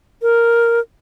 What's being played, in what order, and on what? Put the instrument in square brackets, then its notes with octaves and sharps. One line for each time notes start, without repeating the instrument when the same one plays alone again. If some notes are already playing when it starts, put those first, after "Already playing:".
[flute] A#4